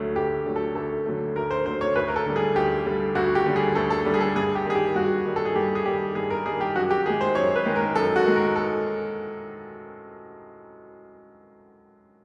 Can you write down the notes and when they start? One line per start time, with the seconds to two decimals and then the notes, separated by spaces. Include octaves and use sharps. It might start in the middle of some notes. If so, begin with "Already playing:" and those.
Already playing: D2 D3 F#3 A3
0.16 D2 G4
0.46 D3 F#3 A3
0.56 A4
0.75 D2 A4
1.06 D3 F#3 A3
1.36 D2 A#4
1.51 C5
1.65 D3 F#3 A3 C5
1.81 C#5
1.96 D2 B4
2.08 A#4
2.16 A4
2.26 D3 G3
2.36 G#4
2.56 D2 G4
2.86 D3 G3
3.15 D2 F#4
3.35 G4
3.46 D3 G3
3.56 G#4
3.75 D2 A4
3.90 A4
4.06 D3 G3
4.14 G#4
4.21 A4
4.36 G2 G#4
4.55 G4
4.65 D#3 G3 G#4
4.75 G4
4.95 G2 F#4
5.26 D#3 G3
5.36 A4
5.45 G#4
5.55 G2 G4
5.75 G#4
5.86 D#3 G3 G4
6.15 G2 G#4
6.30 A#4
6.46 D#3 G3 G#4
6.61 G4
6.75 F#2 F#4
6.91 G4
7.06 D#3 G#4
7.10 G#3
7.21 C5
7.35 F#2 C#5
7.56 B4
7.66 D#3 G#3
7.76 A#4
7.95 F#2 A4
8.16 F#4
8.25 D#3 G#3
8.36 A#4
8.56 A4